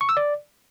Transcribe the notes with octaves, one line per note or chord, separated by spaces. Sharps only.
C#6
E6
D5